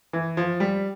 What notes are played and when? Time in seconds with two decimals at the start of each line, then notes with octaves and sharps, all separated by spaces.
0.13 E3
0.37 F3
0.60 G3